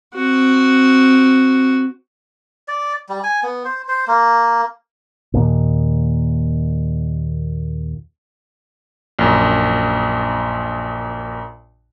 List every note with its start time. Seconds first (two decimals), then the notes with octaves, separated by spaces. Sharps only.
0.14 C4 F#4
2.68 D5
3.09 G3
3.23 G#5
3.43 B3
3.65 C5
3.88 C5
4.07 A#3
5.34 D#2 A#2
9.19 A#1 F#2